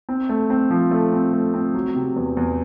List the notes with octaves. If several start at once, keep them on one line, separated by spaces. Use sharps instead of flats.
C4
A3
C4
F3
A3
C4
A3
C4
F#3
C3
E2
E2